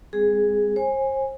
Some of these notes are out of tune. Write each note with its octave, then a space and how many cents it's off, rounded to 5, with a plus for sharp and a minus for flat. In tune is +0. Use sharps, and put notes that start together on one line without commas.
G#3 -30 C4 +5 G#4 +0
C5 +40 G#5 -10